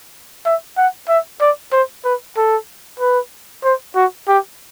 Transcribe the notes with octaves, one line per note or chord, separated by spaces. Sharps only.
E5
F#5
E5
D5
C5
B4
A4
B4
C5
F#4
G4